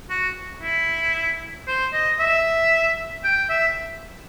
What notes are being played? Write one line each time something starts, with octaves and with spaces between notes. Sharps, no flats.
F#4
E4
C5
D#5
E5
G5
E5